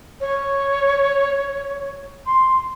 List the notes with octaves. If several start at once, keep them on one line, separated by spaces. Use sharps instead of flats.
C#5
C6